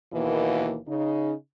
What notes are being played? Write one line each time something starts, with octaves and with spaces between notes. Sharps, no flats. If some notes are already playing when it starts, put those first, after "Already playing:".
D#2 B2 E3 A#3
C#3 D#4